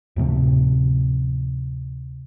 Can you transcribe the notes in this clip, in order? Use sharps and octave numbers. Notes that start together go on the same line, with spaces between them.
D2 A2 C3 F3